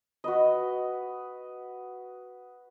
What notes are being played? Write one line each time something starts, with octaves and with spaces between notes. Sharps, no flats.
F#4 B4 D#5